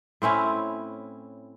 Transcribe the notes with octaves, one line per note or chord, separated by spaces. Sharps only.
A2 C4 C#4 E4